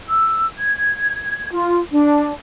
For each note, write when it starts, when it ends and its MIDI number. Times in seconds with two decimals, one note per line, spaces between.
0.08 0.45 88
0.57 1.52 92
1.52 1.80 65
1.91 2.32 62